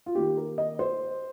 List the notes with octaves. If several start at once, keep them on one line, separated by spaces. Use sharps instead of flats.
F4
D#3 A#3 D#4 G4
A#4
D#5
C5